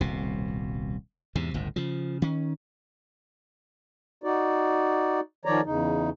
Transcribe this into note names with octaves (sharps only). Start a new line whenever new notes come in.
D#1 C2 B2
E2 G#2 C3
G1 C#2 A2
C#3 F3
D#3 C#4
D#4 F#4 D5
D#3 F3 C#5 D5 A#5
E2 C#3 D#4